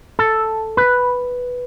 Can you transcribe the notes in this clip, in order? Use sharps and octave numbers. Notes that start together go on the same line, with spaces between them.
A4
B4